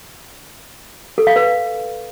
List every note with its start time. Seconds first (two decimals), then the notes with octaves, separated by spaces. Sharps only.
1.18 A4
1.27 F5
1.36 B4